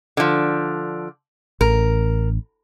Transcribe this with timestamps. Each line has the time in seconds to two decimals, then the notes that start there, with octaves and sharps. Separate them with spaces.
0.17 D3 F3
1.61 A1 A#4